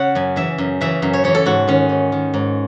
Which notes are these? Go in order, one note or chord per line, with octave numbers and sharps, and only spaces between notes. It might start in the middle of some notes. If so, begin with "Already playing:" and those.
Already playing: C#3 C#5 F#5
F#2 G#5
C#3 E3 E5
F#2
C#3 E3 E5
F#2
C#5
C#3 E3 C#5
A4
G#2 F#4
D#3 C#4
G#2
D#3
G#2